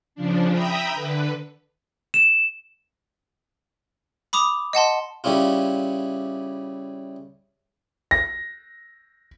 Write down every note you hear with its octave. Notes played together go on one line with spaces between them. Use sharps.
C#3 F3 D4
E5 G5 A#5 B5 D#6
D3 B4
E7
B5 D6 D#6 F7
D#5 F#5 A5 C6
C#3 G3 C#4 E4 F4
A#6